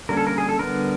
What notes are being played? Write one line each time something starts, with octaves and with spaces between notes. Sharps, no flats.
D3 G3 A#3 C#4 A#4
A4
A#4
G#4
A4
D3 G3 B3 A#4